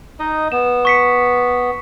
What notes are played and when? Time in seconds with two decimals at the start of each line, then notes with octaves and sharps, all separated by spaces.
0.19 D#4 D#5
0.52 B3 E7
0.85 C#6 B6 C#7